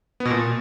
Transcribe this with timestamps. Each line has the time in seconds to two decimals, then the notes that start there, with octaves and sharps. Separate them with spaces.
0.20 B3
0.25 B2
0.31 A#2